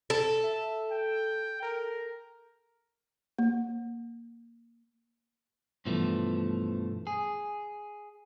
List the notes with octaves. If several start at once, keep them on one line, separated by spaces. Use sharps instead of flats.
A4
E5
G5
A#4
A#3
G2 B2 E3 F3 A3
G#4